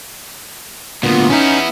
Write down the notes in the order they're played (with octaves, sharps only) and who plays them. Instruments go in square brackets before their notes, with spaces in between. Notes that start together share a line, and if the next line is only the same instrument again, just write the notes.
[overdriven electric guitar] D2 A#2 [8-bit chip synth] B3 F4
[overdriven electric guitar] B3 E4 [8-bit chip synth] C#4 D#4